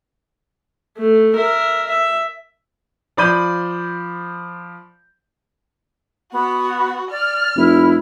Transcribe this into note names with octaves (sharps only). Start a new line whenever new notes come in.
A3
A#4 E5
E5
F3 C5 D5 B5 G6 D#7
B3 F#4
D5 F6
F1 E4